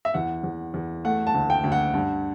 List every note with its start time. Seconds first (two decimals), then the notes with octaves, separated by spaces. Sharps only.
0.05 E5
0.14 E2 F#5
0.44 E2
0.74 E2
1.05 A3 F#5
1.27 A5
1.34 D2
1.50 G5
1.64 D2
1.72 F#5
1.94 G2